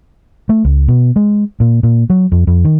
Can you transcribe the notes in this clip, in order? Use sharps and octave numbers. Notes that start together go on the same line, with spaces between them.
A3
C#2
B2
G#3
A#2
A#2
F#3
F2
F2
D#3